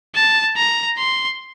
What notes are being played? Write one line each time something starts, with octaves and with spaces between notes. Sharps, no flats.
A5
A#5
C6